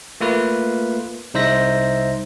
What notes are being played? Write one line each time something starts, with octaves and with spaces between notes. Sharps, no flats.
A3 A#3 F4 B4
C2 D#4 C5 E5 A#6